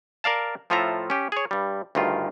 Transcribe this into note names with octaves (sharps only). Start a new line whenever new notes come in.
A#4 D5 F5 A5
A2 F3 F4 A4 E5 A#5
C#4 G4
G#4 C#5
G2 G3
D2 G2 D#3 F4